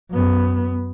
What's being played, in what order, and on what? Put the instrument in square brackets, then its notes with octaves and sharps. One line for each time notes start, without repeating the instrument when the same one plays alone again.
[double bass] F#2 B3